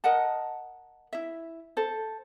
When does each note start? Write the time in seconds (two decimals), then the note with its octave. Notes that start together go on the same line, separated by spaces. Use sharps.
0.04 A#4 D#5 F#5 A5
1.13 E4 E5
1.77 A4 C5